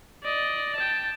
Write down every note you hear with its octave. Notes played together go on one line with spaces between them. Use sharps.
D5 D#5
G5 A5